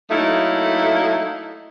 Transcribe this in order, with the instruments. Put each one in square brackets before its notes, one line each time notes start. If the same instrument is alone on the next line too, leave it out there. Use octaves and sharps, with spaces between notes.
[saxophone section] F#3 A3 A#3 D#4 E4